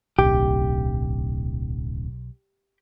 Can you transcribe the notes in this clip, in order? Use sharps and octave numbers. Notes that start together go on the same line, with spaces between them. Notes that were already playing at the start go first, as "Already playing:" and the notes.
D1 B1 G4